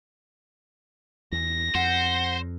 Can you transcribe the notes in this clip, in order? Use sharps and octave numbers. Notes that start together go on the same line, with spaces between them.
E2 A#6
F2 C5 F#5